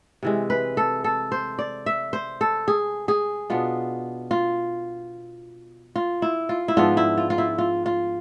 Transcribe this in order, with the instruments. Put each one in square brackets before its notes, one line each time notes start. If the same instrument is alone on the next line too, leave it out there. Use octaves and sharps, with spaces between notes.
[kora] C3 E3 G#3
B4
A4
A4
C5
D5
E5
C5
A4
G#4
G#4
B2 B3 D4 F4
F4
F4
E4
F4
E4
G#2 F3 B3 D4 F4
E4
F4
F4
E4
F4
F4